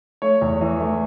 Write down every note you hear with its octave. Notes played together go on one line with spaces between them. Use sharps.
A3 C#5
E2
E3
A3